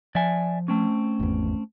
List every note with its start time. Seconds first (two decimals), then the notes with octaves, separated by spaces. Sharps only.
0.15 F3 D5 E5 G#5
0.68 A3 C4 C#4
1.20 G#1 E2